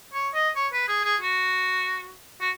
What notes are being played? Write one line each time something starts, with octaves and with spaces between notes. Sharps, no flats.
C#5
D#5
C#5
B4
G#4
G#4
F#4
F#4